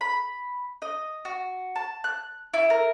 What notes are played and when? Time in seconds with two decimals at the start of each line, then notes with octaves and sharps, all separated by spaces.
0.01 B5
0.82 D#5
1.25 F#4
1.76 A5
2.04 F#6
2.54 E4
2.70 A#4